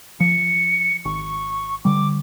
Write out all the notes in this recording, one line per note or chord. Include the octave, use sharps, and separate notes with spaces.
F3 C#7
G#1 C#6
D3 G3 D6